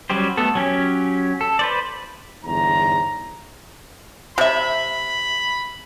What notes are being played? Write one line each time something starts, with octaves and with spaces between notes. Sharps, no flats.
F#3 G3 C#4 G4 C5
A3 B3 A4
F#3 C#4 G4
A4
B4 C5 D5
G1 E2 G#2 A#5
C3 E5 B5